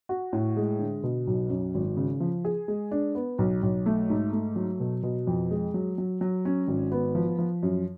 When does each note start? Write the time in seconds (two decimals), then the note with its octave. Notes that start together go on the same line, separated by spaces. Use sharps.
0.09 F#4
0.33 A2
0.57 G#3
0.79 D3
1.03 B2
1.27 B1
1.50 F#2
1.74 G#1
1.97 C#3
2.20 F3
2.45 G#4
2.68 G#3
2.91 D4
3.15 B3
3.38 B1
3.63 B1
3.86 A3
4.10 G#2
4.33 A3
4.56 F#3
4.80 B2
5.03 B2
5.27 F2
5.51 G#3
5.74 F#3
5.98 F#3
6.21 F#3
6.45 C#4
6.68 G#1
6.92 B3
7.15 F3
7.38 F3
7.63 F#2